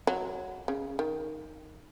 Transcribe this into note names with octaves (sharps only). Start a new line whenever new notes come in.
F#3
C#3
D#3